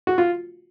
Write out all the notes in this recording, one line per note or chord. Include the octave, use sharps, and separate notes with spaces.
F#4
F4